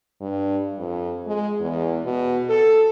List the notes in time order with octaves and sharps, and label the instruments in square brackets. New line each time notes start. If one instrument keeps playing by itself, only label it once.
[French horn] G2
F2
G#3
E2
B2
A4